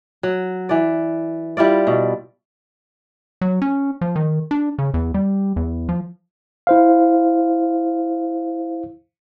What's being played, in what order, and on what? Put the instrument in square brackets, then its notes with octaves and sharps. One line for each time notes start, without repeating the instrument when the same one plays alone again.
[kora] F#3
E3 D5
G3 E4 F4 D5
B2
[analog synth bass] F#3
C#4
F3
D#3
D4
C#3
E2
G3
E2
F3
[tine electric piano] E4 C5 F5